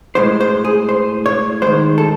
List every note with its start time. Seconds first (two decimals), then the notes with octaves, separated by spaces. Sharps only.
0.15 A2 G#3 C5
0.41 C5
0.65 G#4
0.89 C5
1.26 C#5
1.62 D#3 G#3 C5
1.98 A4